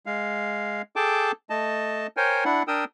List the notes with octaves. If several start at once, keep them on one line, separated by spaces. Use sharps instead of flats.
G#3 F5
G#4 A4 G5 A5 D6
A3 D#5 A5
A#4 C5 C#5 G5 G#5
D4 E4 F#5
D4 A#4 G5 D#6 E6